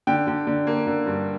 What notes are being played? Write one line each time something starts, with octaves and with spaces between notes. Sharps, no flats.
D3 G5
D3
D3
A#3
D3
G2